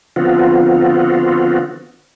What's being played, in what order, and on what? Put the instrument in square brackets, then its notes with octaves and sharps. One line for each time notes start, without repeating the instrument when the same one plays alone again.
[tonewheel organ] D3 F3 B3 C4 F4 F#4